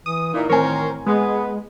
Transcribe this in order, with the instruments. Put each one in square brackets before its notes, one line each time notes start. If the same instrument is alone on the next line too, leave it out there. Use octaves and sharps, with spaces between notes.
[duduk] E3 [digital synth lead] D#6
[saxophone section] A#2 [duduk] D#4 [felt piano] E4
[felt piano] A1 C4 G#5 [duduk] D#3 [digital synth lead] A#4 [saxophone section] C5 C#5
[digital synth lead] G#3 [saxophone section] B3 [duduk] G#4